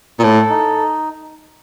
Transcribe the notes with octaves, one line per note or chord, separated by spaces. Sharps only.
A#2
A2 A4
D#4